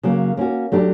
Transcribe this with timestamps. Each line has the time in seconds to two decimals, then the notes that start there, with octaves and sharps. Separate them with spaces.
0.03 C#3 F#3 A#3
0.37 A#3 C#4 F#4
0.72 F#3 A3 D4 G4